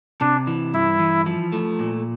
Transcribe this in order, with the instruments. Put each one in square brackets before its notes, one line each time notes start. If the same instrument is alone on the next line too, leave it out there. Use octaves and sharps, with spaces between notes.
[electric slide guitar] C3 [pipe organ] D4
[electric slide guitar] E3
[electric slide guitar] G2 [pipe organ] E4
[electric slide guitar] E3
F3
A3
A#2